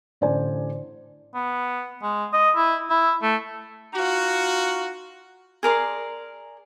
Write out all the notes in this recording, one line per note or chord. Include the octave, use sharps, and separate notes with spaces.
A1 D3 C5 D5 G#5
B3
G#3
D#5
E4
E4
A3
D#4 F4 F#4
G#4 A#4 D5 C6